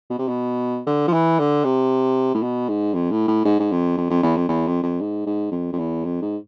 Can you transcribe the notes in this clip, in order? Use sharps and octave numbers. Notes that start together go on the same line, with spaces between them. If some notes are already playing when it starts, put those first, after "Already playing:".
B2
C3
B2
D3
F3
E3
D3
C3
A2
B2
G#2
F2
A2
A2
G#2
G#2
F2
F2
F2
E2
F2
E2
F2
F2
G#2
G#2
F2
F2
E2
F2
G#2